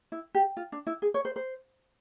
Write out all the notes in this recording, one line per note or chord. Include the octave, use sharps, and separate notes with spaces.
E4
G4
F4
D4
E4
G#4
C#5
C5
C5